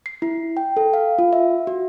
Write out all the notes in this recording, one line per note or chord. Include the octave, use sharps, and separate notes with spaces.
C7
E4
G5
A4
F5
F4
E5
F#4